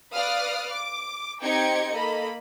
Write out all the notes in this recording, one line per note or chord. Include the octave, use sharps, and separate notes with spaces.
B4 D5 F5 D#6 F6 F#6
D6
C4 D#4 G4 G5 G#6 C#7
A#3 A4 D#5 B5